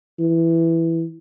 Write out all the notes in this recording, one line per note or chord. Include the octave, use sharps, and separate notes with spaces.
E3